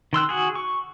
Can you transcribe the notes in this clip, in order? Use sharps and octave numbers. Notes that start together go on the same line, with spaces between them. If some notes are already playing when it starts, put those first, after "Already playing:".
D#3 C6 E6 F#6
F#4 G#4
C#6